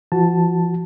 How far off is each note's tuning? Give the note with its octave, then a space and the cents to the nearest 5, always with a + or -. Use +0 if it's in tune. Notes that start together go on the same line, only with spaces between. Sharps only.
F3 -35 F#4 +0 A5 +0